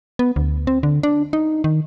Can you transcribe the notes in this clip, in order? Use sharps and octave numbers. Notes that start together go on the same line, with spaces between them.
B3
D2
C4
D3
D4
D#4
D#3